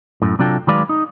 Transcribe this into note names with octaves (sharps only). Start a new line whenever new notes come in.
F#2 A2
C3 F#3 D4 F4 A4 G5
D#3 F#3 G#3 B4 D5 F5
D#4